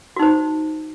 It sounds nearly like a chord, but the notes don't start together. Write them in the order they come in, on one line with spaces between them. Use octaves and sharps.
F#4 D#4 C5